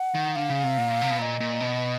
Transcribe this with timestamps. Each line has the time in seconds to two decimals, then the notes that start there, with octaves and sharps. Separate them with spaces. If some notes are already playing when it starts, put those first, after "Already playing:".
Already playing: F#5
0.15 D#3
0.35 D3 F5
0.50 C#3
0.63 C3
0.77 A#2
1.01 C3
1.10 B2
1.18 A#2 D#5 F5
1.40 A#2
1.60 B2